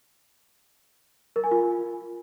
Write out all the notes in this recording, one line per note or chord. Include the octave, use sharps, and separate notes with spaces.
A#4
G#5
F4